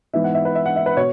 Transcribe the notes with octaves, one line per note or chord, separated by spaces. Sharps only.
G#2 E3 B3 E5
F#5
E5
B4
E5
F#5
E5
B4
B2 C#5